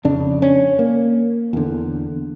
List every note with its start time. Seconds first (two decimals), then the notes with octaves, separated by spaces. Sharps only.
0.04 F2 C#3 D4
0.42 C#4
0.79 A#3
1.53 E2 D3